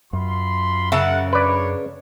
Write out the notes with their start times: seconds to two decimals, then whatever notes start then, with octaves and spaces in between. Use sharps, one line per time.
0.13 F#2 F4 B5 C6
0.92 C#3 A#4 E5 F#5 A5
1.33 D4 B4 C#5 D5